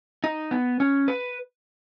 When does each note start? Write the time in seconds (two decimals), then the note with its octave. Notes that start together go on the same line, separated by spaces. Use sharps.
0.24 D#4
0.51 B3
0.80 C#4
1.08 B4